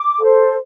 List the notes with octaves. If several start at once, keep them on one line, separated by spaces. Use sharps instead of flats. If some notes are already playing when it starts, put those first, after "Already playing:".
Already playing: D6
A4 C5